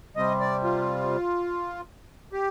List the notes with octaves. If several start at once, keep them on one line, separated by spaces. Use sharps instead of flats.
C3 G3 C4 D#5
D5
F4
G4